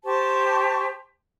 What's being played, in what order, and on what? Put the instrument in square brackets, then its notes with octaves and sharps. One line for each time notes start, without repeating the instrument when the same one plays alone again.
[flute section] G4 C5 A5 C#6